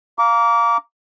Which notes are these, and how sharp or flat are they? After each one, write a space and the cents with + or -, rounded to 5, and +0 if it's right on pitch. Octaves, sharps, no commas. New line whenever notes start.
F5 +0 A#5 +0 D6 -25